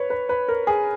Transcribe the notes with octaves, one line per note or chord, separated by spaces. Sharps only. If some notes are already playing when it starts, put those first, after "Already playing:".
Already playing: B4 C#5
B4
B4
A#4
G#4